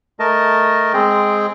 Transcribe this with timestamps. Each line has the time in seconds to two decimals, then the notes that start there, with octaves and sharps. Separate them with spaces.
0.20 A3 A#4 D#5 A5
0.93 G#3 C4 G#4 G5